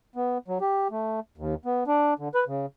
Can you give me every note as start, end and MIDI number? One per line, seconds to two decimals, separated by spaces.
0.16 0.38 59
0.48 0.58 54
0.61 0.88 67
0.91 1.20 57
1.37 1.55 39
1.65 1.84 59
1.87 2.14 62
2.19 2.28 50
2.35 2.44 71
2.47 2.66 49